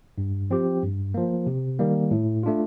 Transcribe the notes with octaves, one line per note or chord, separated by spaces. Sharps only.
G2
F3 C4 G4
G2
F3 A#3
C3
D#3 G3 A#3
A2
A3 D4 F4